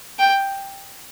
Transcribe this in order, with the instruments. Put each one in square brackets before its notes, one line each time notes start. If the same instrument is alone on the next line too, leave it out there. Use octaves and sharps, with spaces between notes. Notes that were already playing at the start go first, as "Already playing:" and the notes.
[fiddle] G5